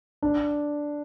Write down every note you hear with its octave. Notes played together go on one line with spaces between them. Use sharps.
D4